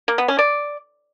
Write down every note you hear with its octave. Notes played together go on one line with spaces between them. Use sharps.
A#3
B3
C#4
D5